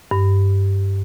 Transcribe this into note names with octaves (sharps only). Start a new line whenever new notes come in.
G2